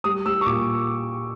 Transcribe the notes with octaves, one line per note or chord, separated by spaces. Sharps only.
G3 D#6
G3 E6
C#6
A#2 D6